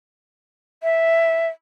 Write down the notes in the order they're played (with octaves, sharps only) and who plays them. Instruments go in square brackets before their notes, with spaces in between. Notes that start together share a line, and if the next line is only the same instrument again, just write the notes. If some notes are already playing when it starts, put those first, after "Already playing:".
[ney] E5